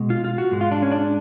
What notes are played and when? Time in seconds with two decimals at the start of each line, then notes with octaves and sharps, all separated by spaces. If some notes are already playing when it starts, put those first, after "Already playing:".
Already playing: B2 G#3
0.10 F4
0.24 F4
0.38 F#4
0.51 G#2 G#3
0.61 F4
0.72 D4
0.82 C#4
0.92 D4